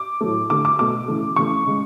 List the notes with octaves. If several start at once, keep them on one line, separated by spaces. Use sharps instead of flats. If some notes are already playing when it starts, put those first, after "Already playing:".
Already playing: D6
A2 F#3 A3
D3 A3 D6
D6
B2 A3 D6
C#3 E3 A3
C#3 E3 A3 C#6
C#3 G#3